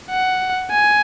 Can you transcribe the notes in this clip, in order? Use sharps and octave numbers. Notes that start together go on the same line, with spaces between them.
F#5
G#5